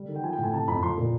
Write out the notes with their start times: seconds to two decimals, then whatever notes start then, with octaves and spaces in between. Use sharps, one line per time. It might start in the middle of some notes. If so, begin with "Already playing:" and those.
Already playing: G3
0.08 D#3
0.15 G5
0.23 F3 G#5
0.33 G5
0.38 A2
0.43 G#5
0.53 C3 A5
0.68 F2 B5
0.83 F3 C6
0.98 A#2